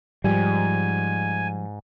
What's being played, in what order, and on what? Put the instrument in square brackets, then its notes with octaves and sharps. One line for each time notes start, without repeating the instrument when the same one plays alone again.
[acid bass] G#2 [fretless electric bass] F3 G3 [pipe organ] G#5